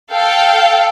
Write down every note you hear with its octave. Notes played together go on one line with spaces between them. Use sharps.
A4 F5 G5